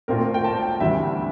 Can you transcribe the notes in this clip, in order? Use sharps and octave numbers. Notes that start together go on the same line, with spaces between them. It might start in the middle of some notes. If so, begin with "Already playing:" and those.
A#2 A3 C4 F4 A#4
G5
A5
G5
D2 C3 E3 G3 E5